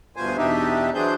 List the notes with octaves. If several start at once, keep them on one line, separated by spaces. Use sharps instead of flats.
D2 G2 B2 F3 C5 G#5
E2 B2 D4 D#4 G4 E5
E3 F#3 D4 G#4 C5 G6